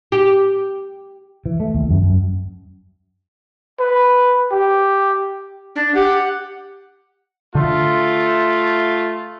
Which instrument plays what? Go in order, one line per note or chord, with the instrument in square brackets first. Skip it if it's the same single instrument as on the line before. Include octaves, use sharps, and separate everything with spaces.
[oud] G4
[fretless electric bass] E3
A3
D#2
F#2
F#2
[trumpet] B4
G4
[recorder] D4
[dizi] G4 [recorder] F#5
[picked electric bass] D3 [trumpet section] A3 F4